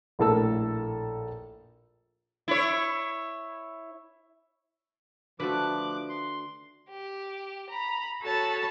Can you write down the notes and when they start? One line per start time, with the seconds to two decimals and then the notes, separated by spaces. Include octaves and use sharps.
0.19 A#1 A2 A#3 A4 A5 E6
2.48 E4 C#5
5.40 D3 F3 A3 F#4 B4 D6 F#6
6.09 C6
6.89 G4
7.70 A#5 B5
8.23 F#4 A4 C#5 A5 B5